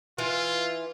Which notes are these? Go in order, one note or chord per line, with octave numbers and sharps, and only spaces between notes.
E3 F4